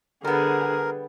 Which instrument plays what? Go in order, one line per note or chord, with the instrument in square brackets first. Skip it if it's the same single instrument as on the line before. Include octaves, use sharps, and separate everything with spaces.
[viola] D3 G#4 [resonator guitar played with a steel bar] G3 B3 [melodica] A#4